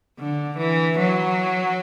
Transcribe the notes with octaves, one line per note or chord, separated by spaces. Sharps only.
D3
E3
F#3